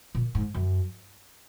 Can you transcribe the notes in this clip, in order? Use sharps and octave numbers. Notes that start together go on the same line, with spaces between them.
A#2
G#2
F#2